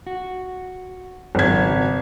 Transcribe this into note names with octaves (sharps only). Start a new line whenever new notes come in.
F#4
G#1 C#2 F#3 G#6